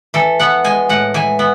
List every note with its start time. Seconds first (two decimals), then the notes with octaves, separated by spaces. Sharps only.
0.14 E3 A4
0.40 B3 F#5
0.64 G#3 G#5
0.89 A2 F#5
1.14 E3 G#5
1.39 B3